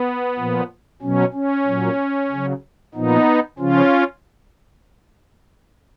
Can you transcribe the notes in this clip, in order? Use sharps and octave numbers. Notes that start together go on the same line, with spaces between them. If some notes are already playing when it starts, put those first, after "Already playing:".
Already playing: B3
A#2 F3
B2 F#3 C#4
C#4
A#2 F#3
C#3 F#3
A#2 F3 B3 D#4
C#3 F3 C#4 F4